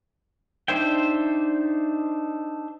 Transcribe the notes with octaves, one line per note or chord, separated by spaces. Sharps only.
D4 D#4 C5 E5 G5